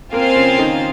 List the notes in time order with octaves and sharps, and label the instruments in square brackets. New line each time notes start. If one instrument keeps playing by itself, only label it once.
[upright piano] A#3 A#4 [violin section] C4 F4 C5 F5 G#5
[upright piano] C#3 C#4
D#3 D#4